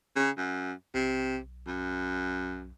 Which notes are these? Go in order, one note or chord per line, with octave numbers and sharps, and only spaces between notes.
C#3
F#2
B1 C3
F#2